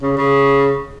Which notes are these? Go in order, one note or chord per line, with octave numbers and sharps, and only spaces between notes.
C#3
C#3